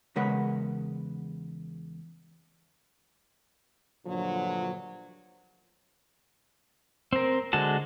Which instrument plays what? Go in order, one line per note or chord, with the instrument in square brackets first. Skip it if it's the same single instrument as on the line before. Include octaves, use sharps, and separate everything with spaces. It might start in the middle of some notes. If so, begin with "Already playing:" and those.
[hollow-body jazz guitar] E2 C#3 G#3 A#4 B4 F#5
[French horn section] G2 A#2 D3 F3 F#3
[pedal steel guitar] C4 A#4
D3 G#3 F#4 A5